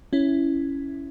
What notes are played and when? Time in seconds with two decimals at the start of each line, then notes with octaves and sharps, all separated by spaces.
0.13 C#4 E4